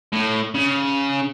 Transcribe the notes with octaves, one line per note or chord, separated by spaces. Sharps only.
A2
C#3